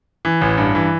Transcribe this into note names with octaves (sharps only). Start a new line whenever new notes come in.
E3
A1
G2
E3